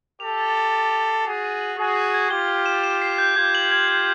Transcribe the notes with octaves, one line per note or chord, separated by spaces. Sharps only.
G4 A4 F7
A6
F7
A6
F7
C7
F#4 G#4 C7
D#7
F#7
F#4 G#4 C7
G#6
G#6
F4 G4 G7
G7
E7
E7
C7
G6
F4 G4 G#6
F#7
G#6
F#7